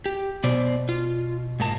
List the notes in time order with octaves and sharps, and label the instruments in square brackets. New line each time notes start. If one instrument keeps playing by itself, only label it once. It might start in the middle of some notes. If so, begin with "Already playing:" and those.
[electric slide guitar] G4
[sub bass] B2 [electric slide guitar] B3 C5 D5
[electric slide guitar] F4
G#2 A#3 A5